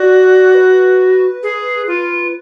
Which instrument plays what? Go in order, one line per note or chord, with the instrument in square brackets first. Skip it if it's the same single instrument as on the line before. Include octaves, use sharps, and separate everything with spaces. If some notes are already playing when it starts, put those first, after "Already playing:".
Already playing: [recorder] F#4 [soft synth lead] D5
[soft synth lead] B4
[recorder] G#4
F4